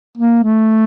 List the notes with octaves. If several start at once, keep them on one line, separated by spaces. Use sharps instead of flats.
A#3
A3